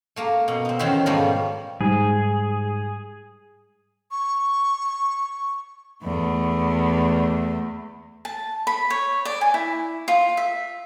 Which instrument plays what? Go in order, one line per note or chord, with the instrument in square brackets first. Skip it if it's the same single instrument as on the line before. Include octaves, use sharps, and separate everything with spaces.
[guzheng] A3 A#3 A#4
B2
C4 D#4
E2 D#3 C#4 F#4 C5 E5
G#2 B2 D#3 F3 G3 A3
[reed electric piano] G#2 [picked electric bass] G3 [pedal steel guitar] G#4
[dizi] C#6
[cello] E2 A3
[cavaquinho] A5
B5
C#5
D5
G#5
E4
F4
E5